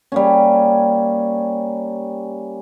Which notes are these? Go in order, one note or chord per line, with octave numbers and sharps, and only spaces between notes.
G3 A#3 C#4